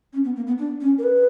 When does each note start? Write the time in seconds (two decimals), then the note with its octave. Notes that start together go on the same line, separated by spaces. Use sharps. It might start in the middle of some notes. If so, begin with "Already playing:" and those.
0.13 C#4
0.24 B3
0.36 A#3
0.47 B3
0.58 D4
0.81 C#4
0.98 A#4
1.03 B4